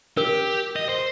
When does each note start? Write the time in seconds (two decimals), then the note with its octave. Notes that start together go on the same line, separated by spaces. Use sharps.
0.17 G4 A#4
0.76 D#5
0.89 C5